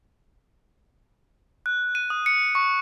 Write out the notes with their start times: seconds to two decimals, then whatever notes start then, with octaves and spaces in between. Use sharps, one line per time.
1.66 F#6
1.95 D#7
2.10 D#6
2.26 C#7
2.55 C#6